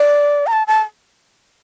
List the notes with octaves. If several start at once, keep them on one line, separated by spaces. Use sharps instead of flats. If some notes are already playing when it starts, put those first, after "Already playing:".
Already playing: D5
A#5
A5
A5